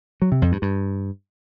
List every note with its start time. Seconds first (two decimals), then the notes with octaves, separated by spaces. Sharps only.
0.22 F#3
0.32 C3
0.42 F2
0.52 G2
0.62 G2